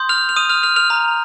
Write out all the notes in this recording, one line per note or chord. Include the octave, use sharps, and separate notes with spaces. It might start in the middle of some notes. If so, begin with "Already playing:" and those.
Already playing: C6 D#6 G6
F6 F7
F7
D#6 D#7
F6 F7
F6 F7
F6 F7
A#5 F6